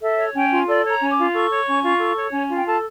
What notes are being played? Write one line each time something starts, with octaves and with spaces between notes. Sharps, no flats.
A4 E5
C#5
C#4 G5
F4
A4 D5
C#5 A#5
C#4
D6
F4
A4 C#6
C#5
C#4
F4
A4
C#5
C#4
F4
G5
A4 A5